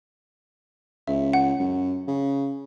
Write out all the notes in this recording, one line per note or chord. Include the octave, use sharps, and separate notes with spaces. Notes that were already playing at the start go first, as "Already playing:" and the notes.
C#2 E5
F#5
F#2
C#3